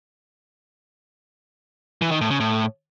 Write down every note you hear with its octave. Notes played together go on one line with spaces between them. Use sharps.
E3
D#3
A2
C#3
A2